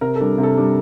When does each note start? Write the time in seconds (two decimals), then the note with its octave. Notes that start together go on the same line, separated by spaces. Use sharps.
0.01 C3 A#4
0.16 G3 D4 A4
0.38 C3
0.43 A4
0.57 G3 D4